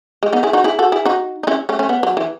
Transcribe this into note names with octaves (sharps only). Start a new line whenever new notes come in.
G#3
B3 D#4
E4 G#4
D#4 F#4
E4 G#4
F#4 A4
E4 G#4
D#4 F#4
D#4
C#4 E4
A3 C#4
A3 C#4
B3
F#3
E3